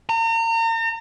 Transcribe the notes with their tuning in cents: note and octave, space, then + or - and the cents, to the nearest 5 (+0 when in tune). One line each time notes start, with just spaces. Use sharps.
A#5 -40